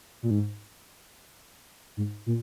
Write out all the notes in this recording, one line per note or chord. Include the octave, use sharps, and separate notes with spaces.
A#2
G#2
G#2
A#2